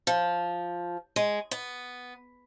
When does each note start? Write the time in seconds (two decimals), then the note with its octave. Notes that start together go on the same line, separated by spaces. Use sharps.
0.07 F3
1.16 G#3
1.51 B3